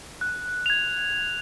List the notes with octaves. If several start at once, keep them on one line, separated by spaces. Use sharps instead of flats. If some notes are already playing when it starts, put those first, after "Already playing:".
F#6
G#6 F7